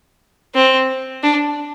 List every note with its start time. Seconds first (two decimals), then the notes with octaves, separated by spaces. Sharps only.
0.55 C4
1.23 D4